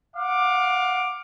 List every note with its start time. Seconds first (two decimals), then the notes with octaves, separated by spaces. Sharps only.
0.16 F5 F#5 D6